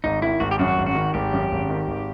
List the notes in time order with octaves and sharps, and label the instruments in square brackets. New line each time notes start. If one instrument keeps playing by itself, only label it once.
[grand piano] G#1 [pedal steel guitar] D#4
[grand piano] D#3 [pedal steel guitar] E4
[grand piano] G#1 [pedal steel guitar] F#4
[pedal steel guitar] G4
[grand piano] F#2 [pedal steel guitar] F#4
[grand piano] G#1
[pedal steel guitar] F#4
[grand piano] D#3
[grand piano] G#1 [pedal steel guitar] G4
[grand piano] F#2
G#1
D#3
G#1